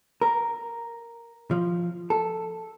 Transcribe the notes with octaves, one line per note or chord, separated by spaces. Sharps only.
A#4
F3
A4